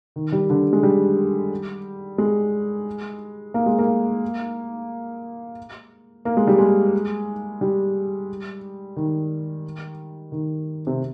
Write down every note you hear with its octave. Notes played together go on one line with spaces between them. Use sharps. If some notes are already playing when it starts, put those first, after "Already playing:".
D#3
G3
D3
G#3
G3
G#3
A#3
G#3
A#3
A#3
G#3
G3
G#3
G3
D#3
D#3
C3